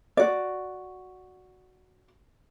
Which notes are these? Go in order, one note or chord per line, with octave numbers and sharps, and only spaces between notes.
F#4 D5